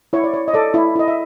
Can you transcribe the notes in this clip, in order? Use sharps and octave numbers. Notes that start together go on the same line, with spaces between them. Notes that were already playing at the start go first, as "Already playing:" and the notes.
E4 C#5
D5
C#5
D#5
A4 D5
E4
E4 D#5
E5